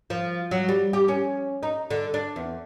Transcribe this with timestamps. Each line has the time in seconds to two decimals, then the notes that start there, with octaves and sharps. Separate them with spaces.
0.10 F3
0.51 F#3
0.69 G3
0.93 G4
1.08 C#4
1.63 D#4
1.91 D3
2.14 D4
2.36 E2